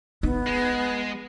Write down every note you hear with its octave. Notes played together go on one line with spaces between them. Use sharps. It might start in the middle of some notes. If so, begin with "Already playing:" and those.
B3 D#4
G#3